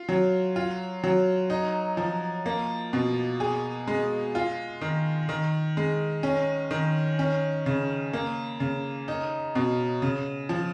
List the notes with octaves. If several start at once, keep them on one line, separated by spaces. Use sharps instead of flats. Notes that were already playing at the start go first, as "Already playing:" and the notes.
Already playing: F4
F#3
F4
F#3
D#4
F3
A#3
B2
G#4
G#3
F4
D#3
D#3
G#3
C#4
D#3
C#4
C#3
A#3
C#3
D#4
B2
C#3
F3